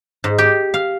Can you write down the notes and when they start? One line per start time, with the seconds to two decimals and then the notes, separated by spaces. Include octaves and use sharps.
0.24 G#2
0.38 G4
0.74 F5